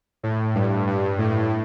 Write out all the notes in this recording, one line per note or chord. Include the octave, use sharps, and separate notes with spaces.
A2
G2
G2
A2